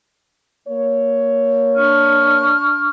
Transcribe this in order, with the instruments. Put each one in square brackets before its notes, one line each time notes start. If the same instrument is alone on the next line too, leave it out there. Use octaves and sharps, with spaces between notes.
[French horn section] A#3 C#5
[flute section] D4 C#6 F6